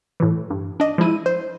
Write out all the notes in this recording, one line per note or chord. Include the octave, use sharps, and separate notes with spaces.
A2 E3
G2
D4 D#5
F3 G#3 E4 D#7
C5